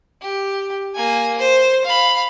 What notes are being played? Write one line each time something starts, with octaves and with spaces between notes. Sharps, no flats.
G4
A#3 G#5
C5
F5 B5